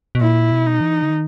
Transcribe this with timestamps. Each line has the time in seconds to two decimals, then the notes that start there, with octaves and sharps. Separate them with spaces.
0.15 B2
0.21 A#2 E4
0.51 B2
0.66 D#4
0.81 E3
1.02 D3
1.10 D#3